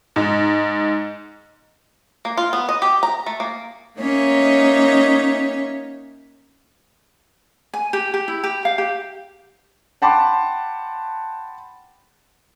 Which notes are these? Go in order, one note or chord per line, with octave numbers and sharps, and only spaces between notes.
G#2
A#3
F4
B3
D#5
G4
A#5
A3
A#3
A#3 C#4 D#4 C#5 E5
G#5
G4
G4
E4
G4
F5
G4
F#5 G5 A5 B5 C6 D6